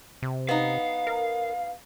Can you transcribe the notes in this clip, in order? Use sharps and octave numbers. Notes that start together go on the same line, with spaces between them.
C3
B3 D#4 F5
A#4